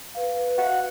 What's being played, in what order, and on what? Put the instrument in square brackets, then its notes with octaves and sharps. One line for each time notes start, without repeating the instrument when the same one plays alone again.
[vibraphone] B4 F5
[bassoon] F#4 [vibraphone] E5